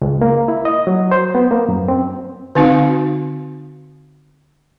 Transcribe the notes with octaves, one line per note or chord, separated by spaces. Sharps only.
C#2
A#3
E4
D#5
F#3
C5
B3
A#3
F#2
C4
D3 C4 D#4 F#4 F5